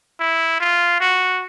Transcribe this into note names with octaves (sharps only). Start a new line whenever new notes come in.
E4
F4
F#4